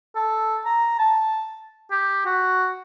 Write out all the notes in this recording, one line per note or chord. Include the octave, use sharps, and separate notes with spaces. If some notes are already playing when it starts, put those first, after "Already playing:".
A4
A#5
A5
G4
F#4